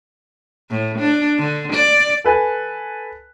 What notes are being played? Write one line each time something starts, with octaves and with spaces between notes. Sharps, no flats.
A2
D4
D3
D5
A4 B4 G#5